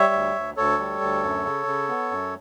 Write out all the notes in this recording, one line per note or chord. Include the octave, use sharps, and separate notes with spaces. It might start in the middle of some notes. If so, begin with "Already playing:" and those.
Already playing: G3 C#5 E5
D2
D2
D2 A4 C#5
G3
D2
F#2
C#3
C#3
B3
F#2